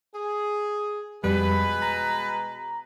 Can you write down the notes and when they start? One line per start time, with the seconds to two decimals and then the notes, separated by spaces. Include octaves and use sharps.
0.15 G#4
1.24 F2 B2 G3 G#3 B4
1.82 A#5